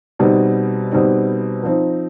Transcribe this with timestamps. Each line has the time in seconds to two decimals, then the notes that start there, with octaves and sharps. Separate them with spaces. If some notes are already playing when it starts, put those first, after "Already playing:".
0.19 B2 G3 C4 D#4
0.92 B2 G3 C4 D#4
1.63 F3 C4 D#4